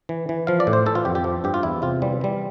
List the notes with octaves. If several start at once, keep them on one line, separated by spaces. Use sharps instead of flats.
E3
E3
F3 F5
D5
A2
C5
E3 A4
F4
F2 G4
G4
F3
G2 G4
F4
E2 E4
C3 F4
E3 G3
E3 G3